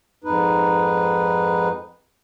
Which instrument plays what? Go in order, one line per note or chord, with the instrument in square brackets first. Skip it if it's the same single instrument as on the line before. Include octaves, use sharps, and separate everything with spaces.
[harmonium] F2 G#2 D#4 B4